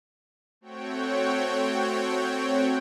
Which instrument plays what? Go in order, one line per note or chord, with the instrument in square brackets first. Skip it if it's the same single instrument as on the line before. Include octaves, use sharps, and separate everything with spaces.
[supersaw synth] A3 C4 F#4 C#5 G5